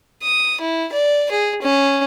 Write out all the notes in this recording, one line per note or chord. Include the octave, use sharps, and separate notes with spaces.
D#6
E4
D5
G#4
C#4